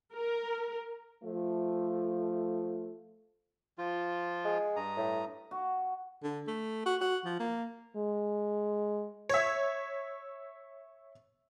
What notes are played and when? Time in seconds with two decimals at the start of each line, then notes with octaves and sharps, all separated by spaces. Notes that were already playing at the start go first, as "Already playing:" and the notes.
0.14 A#4
1.23 F3 A3
3.78 F3 F4
4.45 G#3
4.76 G2 A#5 D#6
4.97 A2
5.51 F#4
6.23 D3
6.47 A3
6.86 F#4
7.01 F#4
7.25 F3
7.40 A#3
7.96 G#3
9.29 C#5 E5